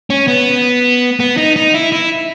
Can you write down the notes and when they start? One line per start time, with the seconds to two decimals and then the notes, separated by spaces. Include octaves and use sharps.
0.10 C#4
0.28 B3
1.20 B3
1.37 D#4
1.56 D#4
1.74 E4
1.92 E4